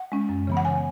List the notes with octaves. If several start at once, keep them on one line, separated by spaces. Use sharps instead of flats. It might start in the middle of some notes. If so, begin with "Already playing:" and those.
Already playing: F#5
G#3 C#4
F#2
C#3 E3 B3
F#5
C#3 G#5